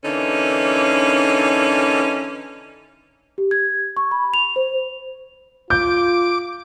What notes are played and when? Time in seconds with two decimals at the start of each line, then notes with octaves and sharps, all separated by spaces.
0.04 D3 E3 A#3 C#4 D#4
3.38 G4
3.51 G#6
3.97 C#6
4.11 B5
4.34 F7
4.56 C5
5.70 F4 D6 G6